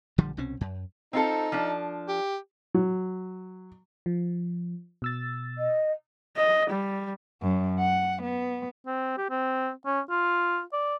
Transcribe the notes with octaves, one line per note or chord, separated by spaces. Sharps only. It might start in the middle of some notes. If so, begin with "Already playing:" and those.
A#1 D3 F3 G3
C2 B2 C4 C#4
F#2
C4 D#4 F4 A4
F3 D4
G4
F#3
F3
B2 E6 A6
D#5
D#5
G3
F#2
F#5
B3
C4
G4
C4
C#4
F4
D5